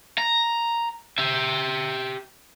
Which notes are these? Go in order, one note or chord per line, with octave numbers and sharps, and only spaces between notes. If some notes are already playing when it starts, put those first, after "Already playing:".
A#5
G4 E5